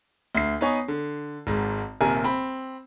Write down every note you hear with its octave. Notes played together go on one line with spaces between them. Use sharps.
D2 C7
B3 D#4 C#5 G#5
D3
G#1 G#2
D#1 D#2 C3 A#4 G#5
C4 B5